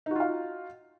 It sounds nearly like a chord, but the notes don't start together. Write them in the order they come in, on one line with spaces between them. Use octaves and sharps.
D#4 F#4 F4 F5